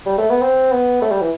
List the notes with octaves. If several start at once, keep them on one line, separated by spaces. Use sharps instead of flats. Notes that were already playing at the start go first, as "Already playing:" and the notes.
G3
A3
B3
C4
B3
A3
G3
E3